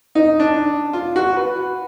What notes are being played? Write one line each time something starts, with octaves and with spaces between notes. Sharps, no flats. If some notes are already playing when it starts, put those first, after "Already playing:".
D#4
D4
F4
F#4
B4